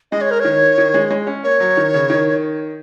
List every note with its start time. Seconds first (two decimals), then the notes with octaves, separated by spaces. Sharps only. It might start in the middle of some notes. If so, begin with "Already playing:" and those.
0.12 G#3 D#5
0.21 C#5
0.31 A#4
0.40 D#3 C#5
0.78 D#3
0.94 G#3
1.11 G#3
1.27 C#4
1.43 A#3 C#5
1.60 F#3
1.77 D#3
1.94 C#3
2.10 D#3